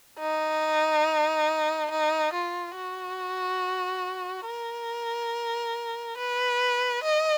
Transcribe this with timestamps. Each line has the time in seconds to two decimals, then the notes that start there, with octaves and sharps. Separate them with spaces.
0.20 D#4
1.91 D#4
2.33 F4
2.76 F#4
4.47 A#4
6.17 B4
7.03 D#5